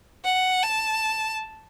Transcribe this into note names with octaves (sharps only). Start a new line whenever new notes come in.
F#5
A5